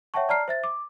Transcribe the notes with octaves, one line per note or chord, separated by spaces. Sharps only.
C#5 E5 F#5 G5 A5 C#6
D5 A5 A#5 F6 C7
C5 E5 A6
D6